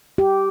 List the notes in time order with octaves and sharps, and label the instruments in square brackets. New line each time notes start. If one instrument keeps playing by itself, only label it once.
[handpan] G4